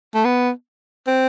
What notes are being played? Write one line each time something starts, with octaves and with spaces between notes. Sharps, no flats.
A3
B3
C4